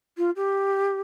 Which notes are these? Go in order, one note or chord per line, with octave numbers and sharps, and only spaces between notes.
F4
G4